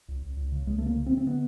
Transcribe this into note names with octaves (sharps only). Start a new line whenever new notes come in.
C#2
C#2
C#2
C#3
C#2 G#3
A3
C#3 A#3
C#3
C4
C#3
C4
D3 B3